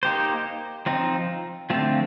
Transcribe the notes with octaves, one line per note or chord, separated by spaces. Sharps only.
A#3 D#4 G4 C5
F3 C4 D#4
D3 F3 A3 C4 F4